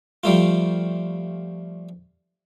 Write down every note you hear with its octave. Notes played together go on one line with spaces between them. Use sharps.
F3 G3 A3 F4